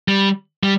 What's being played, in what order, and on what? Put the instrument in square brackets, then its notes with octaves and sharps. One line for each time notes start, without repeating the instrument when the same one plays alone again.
[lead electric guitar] G3
G3